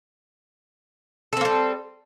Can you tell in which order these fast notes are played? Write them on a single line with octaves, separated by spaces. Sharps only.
A4 C4 A#3 G3